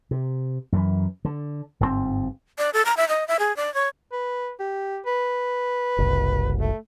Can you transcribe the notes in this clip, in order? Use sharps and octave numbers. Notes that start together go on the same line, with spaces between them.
C3
F#2 E3
D3
G1 G#2 B2 C4
D5
A4
A#5
E5
D#5
E5
G#4
D5
C#5
B4
G4
B4
F#1 C2
A3